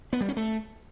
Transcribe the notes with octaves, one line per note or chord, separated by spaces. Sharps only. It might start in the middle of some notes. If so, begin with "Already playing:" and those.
B3
G3
C#4
A3